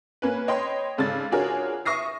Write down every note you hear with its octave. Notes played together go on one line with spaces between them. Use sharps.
A#3 C#4 B4
C#5 D#5 G5 B5 C6
G#2 C#3 A4 D5 A6
D4 F4 F#4 G#4 A#4 C#5
E5 C#6 D#6 A#6 C7